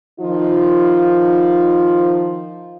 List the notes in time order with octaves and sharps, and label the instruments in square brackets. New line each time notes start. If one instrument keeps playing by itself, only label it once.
[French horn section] D#3 F3 D#4 F4